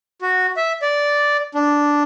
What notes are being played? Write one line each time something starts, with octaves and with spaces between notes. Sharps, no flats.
F#4
E5
D5
D4